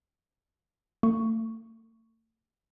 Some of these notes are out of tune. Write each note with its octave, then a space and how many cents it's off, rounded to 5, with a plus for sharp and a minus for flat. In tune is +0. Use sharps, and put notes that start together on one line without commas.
A3 +40 C#6 +0